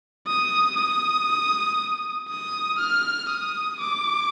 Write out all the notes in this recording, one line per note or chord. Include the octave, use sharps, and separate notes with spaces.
D#6
D#6
D#6
F6
D#6
D6